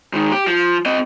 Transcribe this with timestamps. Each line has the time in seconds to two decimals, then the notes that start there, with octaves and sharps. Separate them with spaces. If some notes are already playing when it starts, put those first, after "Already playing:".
0.13 G#2 D#3
0.31 G4
0.47 F3
0.86 C4 D#5